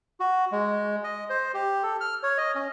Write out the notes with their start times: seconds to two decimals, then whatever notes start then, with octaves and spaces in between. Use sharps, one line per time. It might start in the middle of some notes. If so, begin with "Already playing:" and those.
0.20 F#4
0.52 G#3
1.04 D#5
1.30 C5
1.54 G4
1.83 A4
2.00 F6
2.23 C#5
2.38 D#5
2.55 C#4